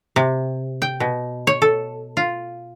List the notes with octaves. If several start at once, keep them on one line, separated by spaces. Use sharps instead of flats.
C3
G5
B2
C#5
A4
F4